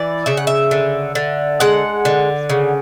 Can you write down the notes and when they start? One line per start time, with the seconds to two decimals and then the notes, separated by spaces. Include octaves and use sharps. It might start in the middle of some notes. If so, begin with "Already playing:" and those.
Already playing: E3 D5
0.26 C#3 E5
0.37 F#5
0.47 E5
0.71 D3
1.15 D3
1.60 G#3 F#5
2.05 D3
2.50 C#3